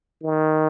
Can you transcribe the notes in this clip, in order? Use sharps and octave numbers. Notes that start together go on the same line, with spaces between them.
D#3